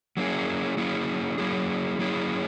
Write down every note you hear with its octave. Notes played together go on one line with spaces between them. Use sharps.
F#3 A#3 C#4 E4 G#4
F#3 A#3 C#4 E4 G#4
F#3 A#3 C#4 E4 G#4
F#3 A#3 C#4 E4 G#4